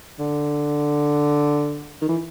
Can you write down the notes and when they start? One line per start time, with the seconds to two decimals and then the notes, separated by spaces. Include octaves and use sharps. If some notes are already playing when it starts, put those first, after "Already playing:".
0.19 D3
2.01 D#3
2.08 E3